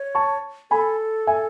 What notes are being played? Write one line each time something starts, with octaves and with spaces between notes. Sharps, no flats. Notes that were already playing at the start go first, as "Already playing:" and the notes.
Already playing: C#5
A5 C#6
A4 G#5 B5
E5 G#5